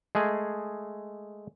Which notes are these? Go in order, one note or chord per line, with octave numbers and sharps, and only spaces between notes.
G#3 A3 G#4